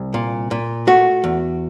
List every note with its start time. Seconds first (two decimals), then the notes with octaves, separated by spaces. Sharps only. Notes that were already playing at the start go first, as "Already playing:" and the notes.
Already playing: C2
0.14 A#2
0.51 A#2
0.87 A3 F#4
1.24 E2